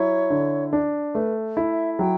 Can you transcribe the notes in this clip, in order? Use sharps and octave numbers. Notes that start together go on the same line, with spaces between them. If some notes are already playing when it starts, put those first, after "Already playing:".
Already playing: F#3 E4 C#5
D3
D4
A3 B4
E4
E5
F#3 G5